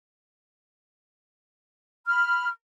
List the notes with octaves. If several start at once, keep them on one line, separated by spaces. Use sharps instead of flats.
B5 F6